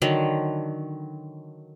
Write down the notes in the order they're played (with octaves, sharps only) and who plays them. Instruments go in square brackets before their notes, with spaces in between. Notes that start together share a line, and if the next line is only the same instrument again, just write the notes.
[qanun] D3 D#3 F#3